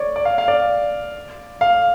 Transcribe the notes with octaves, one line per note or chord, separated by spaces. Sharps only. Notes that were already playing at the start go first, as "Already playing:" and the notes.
Already playing: C#5 D5
D5
F5
F5
D5
F5